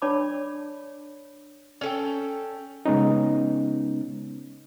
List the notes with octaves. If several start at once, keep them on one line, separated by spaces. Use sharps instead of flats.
D4 C#5 D5 A5 B5 D6
C#4 A4 G5
C#3 G#3 B3 C#4 D#4